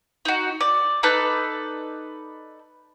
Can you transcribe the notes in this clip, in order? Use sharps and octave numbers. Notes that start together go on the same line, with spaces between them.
D#4 F#4
D5
D#4 A4 B4 D5